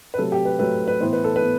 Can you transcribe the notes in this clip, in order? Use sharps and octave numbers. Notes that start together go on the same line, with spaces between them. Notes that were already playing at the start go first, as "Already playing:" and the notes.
B4
C3 F#3 A3 A4
G4
B4
C3 F#3 A3 B4
B4
A2 E3 B3 C5
B4
A4
B4
B3